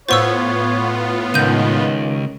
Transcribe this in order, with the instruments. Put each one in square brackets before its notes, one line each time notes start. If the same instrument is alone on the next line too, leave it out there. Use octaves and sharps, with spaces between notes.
[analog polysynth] A2 B3 F4 [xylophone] C5 C#6 E6 [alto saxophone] C#5
[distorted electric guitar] C#2 [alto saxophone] D#3 [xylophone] G6 D#7